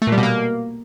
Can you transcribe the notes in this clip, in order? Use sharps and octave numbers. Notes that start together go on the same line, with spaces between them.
A3
A#2
G3
B2
A#3